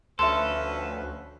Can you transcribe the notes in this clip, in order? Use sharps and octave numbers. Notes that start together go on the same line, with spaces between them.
D2 F3 C#4 A4 B4 E5 C6